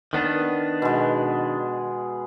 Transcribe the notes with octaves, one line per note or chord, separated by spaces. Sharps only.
D#3 B3 D4
B2 G#3